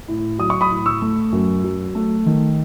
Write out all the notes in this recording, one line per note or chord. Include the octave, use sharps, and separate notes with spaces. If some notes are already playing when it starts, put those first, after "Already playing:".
A2
F#3 D#6
C#6
B5 D#6
A2
C#6 E6
A3
F#2
F#3
A3
D#3